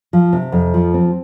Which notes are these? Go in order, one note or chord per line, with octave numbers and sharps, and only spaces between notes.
F3
C3
F2
F3
C4